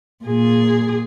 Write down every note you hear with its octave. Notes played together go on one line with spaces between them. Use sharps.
A#2 G#4